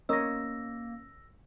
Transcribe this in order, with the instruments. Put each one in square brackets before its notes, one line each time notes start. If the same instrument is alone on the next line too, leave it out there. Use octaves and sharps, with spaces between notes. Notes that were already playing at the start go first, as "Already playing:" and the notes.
[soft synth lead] A#3 [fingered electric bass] B3 C#4 [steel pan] A#4 C#5 D#5 [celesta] E6 A#6